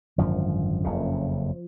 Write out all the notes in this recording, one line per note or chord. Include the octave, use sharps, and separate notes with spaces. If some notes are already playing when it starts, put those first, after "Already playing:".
G#1 F#2 D3 F3
F#1 F2 C#3